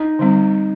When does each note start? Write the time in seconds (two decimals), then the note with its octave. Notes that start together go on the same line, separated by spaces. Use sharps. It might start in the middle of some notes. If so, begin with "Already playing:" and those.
Already playing: D#4
0.19 D3 G3 C4